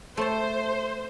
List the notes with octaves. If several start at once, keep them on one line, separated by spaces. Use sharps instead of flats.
A3 C5 A5